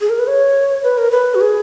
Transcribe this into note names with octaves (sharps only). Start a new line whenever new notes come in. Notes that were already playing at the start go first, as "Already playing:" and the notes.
G#4
A#4
B4
C#5
B4
A#4
B4
F#4
G#4